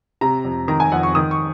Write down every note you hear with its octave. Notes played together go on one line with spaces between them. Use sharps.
C3 A#5
F2
D#3 A#5
G#5
F2 F#5
C#6
D#3 D#6
C#6